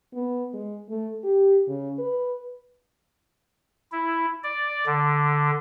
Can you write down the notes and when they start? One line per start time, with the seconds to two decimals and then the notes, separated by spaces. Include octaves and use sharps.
0.14 B3
0.54 G#3
0.89 A3
1.24 G4
1.67 C#3
1.98 B4
3.92 E4
4.43 D5
4.86 D3